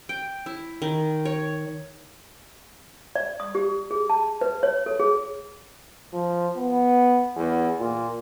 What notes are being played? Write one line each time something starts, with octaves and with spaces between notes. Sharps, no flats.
G5
E4
D#3
C#5
D5
D#6
G4
G#4
A5
B4
C#5
A4
G#4
F3
B3
E2
A#2